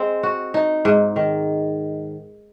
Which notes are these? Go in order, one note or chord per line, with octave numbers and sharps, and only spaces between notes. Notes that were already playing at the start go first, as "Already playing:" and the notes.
Already playing: G#3 C4
F#4
D#4
G#2
D#3